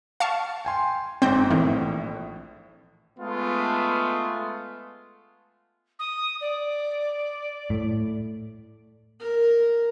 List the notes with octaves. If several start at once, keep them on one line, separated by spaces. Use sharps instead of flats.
F5 A5 C#6
G5 G#5 C6
G1 G#2 C4 G6 A#6
A#1 A2 D#3 E3
G#3 A3 B3 F4
D#6
D5
A2
A#4